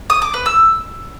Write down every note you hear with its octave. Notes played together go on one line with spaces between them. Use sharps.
D#6
D6
B4
E6